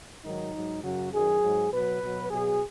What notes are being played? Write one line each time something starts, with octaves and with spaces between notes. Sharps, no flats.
G#2 D#3 F#3 D#4
G#2 F#3
F#2 C#3 F#3 F#4
F#2 D#3 F#3 G#4
G#2 F#3
B2 F#3 B4
B2 F#3
B2 F#3 G#4